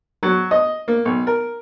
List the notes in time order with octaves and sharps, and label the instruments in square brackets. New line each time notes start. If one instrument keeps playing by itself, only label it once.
[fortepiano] F#3
D#5
A#3
B1
A#4